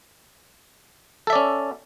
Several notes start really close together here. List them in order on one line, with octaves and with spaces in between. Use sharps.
A4 E5 D5 C#4